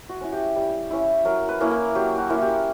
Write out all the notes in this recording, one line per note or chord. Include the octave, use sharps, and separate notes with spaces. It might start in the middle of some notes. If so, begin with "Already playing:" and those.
F#4
C#4 E4
G4
G3
C#4 E4
F#3 A#4
B4
A#3 C#4 E4
A#4
F#3 G4
F#4
A#3 C#4 E4
G4